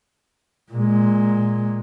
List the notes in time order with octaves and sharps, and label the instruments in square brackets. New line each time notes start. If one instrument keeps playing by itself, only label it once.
[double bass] A#2 G#3